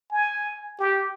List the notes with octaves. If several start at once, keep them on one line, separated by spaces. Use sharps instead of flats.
G#5
G4